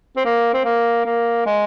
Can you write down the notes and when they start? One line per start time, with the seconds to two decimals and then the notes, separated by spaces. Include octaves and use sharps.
0.17 C4
0.25 A#3
0.54 C4
0.65 A#3
1.06 A#3
1.46 G#3